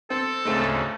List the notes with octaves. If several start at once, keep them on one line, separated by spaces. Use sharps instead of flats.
C4 A4
D2 G#2 C#3 G#3 A3 C4